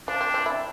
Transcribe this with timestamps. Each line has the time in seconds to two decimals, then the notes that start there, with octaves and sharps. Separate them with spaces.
0.08 F3 D4
0.21 C4
0.34 C4
0.46 E4